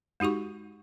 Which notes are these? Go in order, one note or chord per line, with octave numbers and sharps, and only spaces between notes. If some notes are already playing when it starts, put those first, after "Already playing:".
G#3 D#4 F#4 G4 C#6